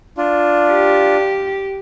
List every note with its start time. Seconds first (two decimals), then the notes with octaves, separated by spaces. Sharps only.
0.17 D4 F4
0.70 G4